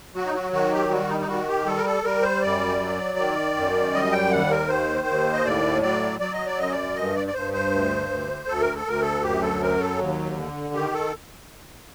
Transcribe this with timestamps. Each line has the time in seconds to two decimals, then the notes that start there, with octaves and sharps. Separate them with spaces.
0.15 F#3 F#4
0.26 D#4
0.34 F#4
0.52 D#3 F#4
0.72 G4
0.90 G3 F#4
1.10 D#4
1.20 D#4
1.28 D#3 F#4
1.48 G4
1.66 G3 A4
1.77 A#4
1.86 A4
2.04 G3 A#4
2.23 C5
2.42 F#2 D5
2.79 F#3
3.18 D#3
3.56 F#2
3.93 G3 D#5
4.12 G5
4.31 D#2 F#5
4.51 A#4
4.69 D#3 C5
5.07 D#2
5.34 D#5
5.45 A2 D5
5.82 F#3 D5
6.20 F#3 D5
6.33 D#5
6.46 D5
6.58 F#2 D#5
6.72 D5
6.96 G2 D#5
7.16 D5
7.27 D5
7.34 G2 C5
7.53 C5
7.71 D2
8.10 D2
8.48 D2 A4
8.61 A#4
8.76 A4
8.86 D2 A#4
9.02 A4
9.23 F#2 G4
9.42 A4
9.61 F#3 A#4
9.80 A4
9.99 D#2
10.37 D3
10.74 D#3 G4
10.94 A4